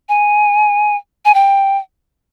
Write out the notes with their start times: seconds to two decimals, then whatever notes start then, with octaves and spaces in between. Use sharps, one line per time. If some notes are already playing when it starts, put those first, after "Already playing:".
0.09 G#5
1.25 G#5
1.34 G5